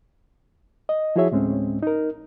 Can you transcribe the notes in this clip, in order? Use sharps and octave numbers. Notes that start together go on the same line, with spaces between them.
D#5
F3 E4 F#4 G#4 C#5 E5
D2 A2 G#3 C4 C#4
D#4 A#4